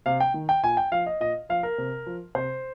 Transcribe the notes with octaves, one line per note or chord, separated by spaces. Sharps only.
C3 F5
G5
D#3
G5
A#2 G#5
G5
F3 F5
D#5
A#2 D#5
F3 F5
A#4
C3
F3
C3 C5